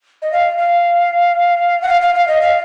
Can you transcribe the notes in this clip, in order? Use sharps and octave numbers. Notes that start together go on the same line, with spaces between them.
D#5
F5
F5
F#5
F5
F5
F5
D#5
F5